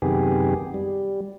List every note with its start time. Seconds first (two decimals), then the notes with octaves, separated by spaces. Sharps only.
0.02 F#2 C3 D#3 B3 G4 G#4
0.74 G3